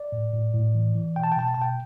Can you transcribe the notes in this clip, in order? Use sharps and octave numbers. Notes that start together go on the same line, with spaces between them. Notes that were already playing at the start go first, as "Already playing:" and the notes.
Already playing: D5
A2
A2
A2
E3
E3
B2 G5
A5
G5
B2 A5
G5
A5
B2 G5